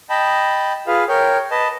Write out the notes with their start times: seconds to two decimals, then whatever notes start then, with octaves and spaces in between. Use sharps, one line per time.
0.10 D#5 G5 A5 B5
0.87 F4 G#4 B4 F5
1.09 A#4 C#5 G5
1.51 B4 D#5 A5